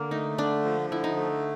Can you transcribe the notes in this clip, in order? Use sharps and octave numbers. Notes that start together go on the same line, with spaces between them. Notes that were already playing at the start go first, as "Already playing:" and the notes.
Already playing: D3 A#3
A3 D#4
D3 D4
F3
D3 E4
D#4
A3